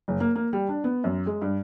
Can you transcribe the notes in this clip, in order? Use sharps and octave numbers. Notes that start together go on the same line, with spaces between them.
F#1
A#3
A#3
G3
D4
B3
F#2
G#3
G2